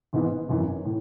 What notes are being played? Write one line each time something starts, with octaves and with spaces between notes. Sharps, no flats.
G#1 G#2 E3 B3
G#1 F#2 E3
A2